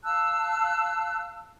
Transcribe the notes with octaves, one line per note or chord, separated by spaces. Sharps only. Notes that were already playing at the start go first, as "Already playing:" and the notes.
F5 A5 E6 F#6